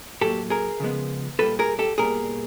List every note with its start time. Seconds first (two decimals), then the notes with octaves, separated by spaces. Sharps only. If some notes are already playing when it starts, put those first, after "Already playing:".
0.21 A2 F#3 A#3 G4 A4
0.50 G#4 A#4
0.80 C#3 F3 G#3 B3
1.39 A#2 G3 A#3 A4 B4
1.59 G#4 A#4
1.79 G4 A4
1.98 A#2 G3 B3 G#4 A#4